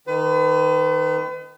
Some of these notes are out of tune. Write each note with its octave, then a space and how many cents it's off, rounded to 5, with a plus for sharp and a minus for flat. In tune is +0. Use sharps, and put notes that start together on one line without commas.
D#3 -5 B4 +40